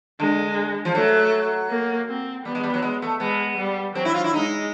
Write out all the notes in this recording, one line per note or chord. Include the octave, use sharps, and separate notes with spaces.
D3 G#3
F3
F#3 A3
A#3
C4
G3 B3
G#3
G3
F#3
G#3
A3
G#3 B3
G3
F#3 C4
E4
F4
E4
G#3 D#4